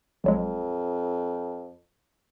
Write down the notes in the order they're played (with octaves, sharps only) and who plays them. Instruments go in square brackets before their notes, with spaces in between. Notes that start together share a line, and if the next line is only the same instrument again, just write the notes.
[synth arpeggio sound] A#1 F#3 G#3 [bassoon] F2